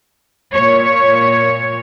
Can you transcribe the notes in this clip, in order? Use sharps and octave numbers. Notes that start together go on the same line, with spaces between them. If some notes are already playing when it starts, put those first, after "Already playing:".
A#2 C#5